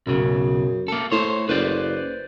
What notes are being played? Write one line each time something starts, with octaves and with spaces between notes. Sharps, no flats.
B1 F#2 C#3
A#3 A4
A2 C5 C#5
F#1 B4 C5 D5